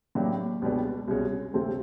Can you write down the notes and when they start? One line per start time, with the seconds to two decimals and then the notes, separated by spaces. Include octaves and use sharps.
0.15 A2 F#3 A#3 D4 G4
0.62 C#2 B2 G3 B3 D4
1.08 C2 B2 G#3 C#4 F#4
1.54 D2 C3 F3 A3 C4